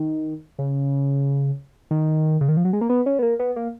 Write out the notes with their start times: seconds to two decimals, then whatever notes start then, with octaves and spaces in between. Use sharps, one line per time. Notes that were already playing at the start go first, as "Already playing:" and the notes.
Already playing: D#3
0.59 C#3
1.91 D#3
2.41 C#3
2.49 D#3
2.57 F3
2.65 F#3
2.73 G#3
2.81 A#3
2.89 B3
3.06 C#4
3.19 B3
3.22 A#3
3.39 B3
3.56 A#3